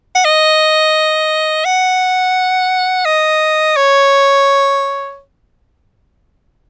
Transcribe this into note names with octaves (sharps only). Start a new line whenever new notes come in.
F#5
D#5
F#5
D#5
C#5